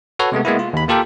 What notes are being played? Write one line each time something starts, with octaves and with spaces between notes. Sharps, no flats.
F#4 A4 B4 C#5
C3 G#3 A3 B3
G#3 A#3 B3 E4
F4
D#2 B5
A#3 F4 G4 A4 A#4 G5